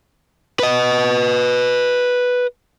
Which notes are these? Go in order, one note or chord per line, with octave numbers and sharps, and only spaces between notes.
B4 D#5